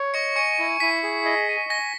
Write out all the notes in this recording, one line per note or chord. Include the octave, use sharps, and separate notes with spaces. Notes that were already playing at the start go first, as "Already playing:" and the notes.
Already playing: C#5
D#5 C#6 C#7
G#5 C#6 C#7
E4
E4 B6
G#4
D#5
G#5
G#5 A#6